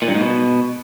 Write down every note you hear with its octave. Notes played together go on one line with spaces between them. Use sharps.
A#2
G2
G#2
B2